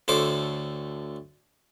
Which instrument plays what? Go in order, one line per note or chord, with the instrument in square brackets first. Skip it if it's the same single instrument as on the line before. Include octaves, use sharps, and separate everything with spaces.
[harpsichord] D2 A2 A4 C5 D6